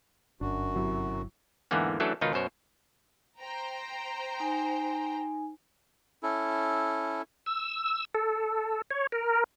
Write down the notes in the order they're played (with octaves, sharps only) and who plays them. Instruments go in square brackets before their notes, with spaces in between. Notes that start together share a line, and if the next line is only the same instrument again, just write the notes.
[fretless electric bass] G1 [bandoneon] F#2 F#4 [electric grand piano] D4
[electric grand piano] C3 F#3 E4
[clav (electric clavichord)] E2 G#2 D3 E3 A#3 B3
E3 F#3 A3 C#4 D4 A4
C#2 B2 D#3 D#4 F4
F#2 B2 C5 C#5
[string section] C5 G5 A#5
[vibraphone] D#4 G#5
[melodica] C#4 E4 A4
[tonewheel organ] E6
A4
C#5
A#4